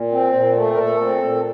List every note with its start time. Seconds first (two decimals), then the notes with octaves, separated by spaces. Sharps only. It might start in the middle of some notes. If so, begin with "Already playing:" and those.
Already playing: A#2
0.12 C4
0.34 A#2
0.56 A3
0.74 A#4
0.78 A#2 A4
1.01 C4
1.23 A#2